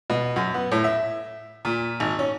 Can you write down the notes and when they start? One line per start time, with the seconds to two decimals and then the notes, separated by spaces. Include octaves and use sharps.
0.10 B2
0.36 F#2
0.54 B3
0.72 A2
0.84 E5
1.65 A#2
2.00 G#1
2.19 C#4